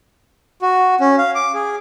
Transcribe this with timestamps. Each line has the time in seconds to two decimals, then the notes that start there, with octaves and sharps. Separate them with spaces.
0.62 F#4
1.01 C#4
1.18 F5
1.35 D6
1.54 G#4